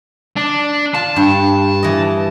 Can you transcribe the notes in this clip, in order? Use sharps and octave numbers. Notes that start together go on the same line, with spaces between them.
D4
F4 A5
G2
E3 D#5